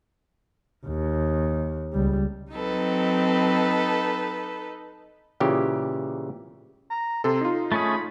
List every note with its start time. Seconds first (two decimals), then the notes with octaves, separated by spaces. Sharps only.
0.86 D#2
1.93 C#2 G3
2.52 F#3 C4 D#4 A4 B4
5.40 A#2 C#3 E3 G4
6.90 A#5
7.24 C3 A4 C6
7.41 D#4 F4
7.72 A3 C#4 G#4 B5